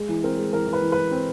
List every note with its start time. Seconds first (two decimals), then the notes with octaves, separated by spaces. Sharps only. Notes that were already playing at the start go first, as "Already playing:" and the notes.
Already playing: G#3
0.09 E3
0.24 C4 A#4
0.38 G#3
0.53 E3 A#4
0.67 E3
0.73 B4
0.82 E3
0.92 E3 B4
1.11 C4